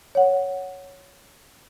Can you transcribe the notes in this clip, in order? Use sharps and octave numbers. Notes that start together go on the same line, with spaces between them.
C#5 F#5